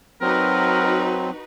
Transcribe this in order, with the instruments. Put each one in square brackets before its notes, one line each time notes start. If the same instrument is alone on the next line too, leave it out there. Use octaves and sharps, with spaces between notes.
[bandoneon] F#3 C4 [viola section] D#4 F#4 B4 [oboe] A#4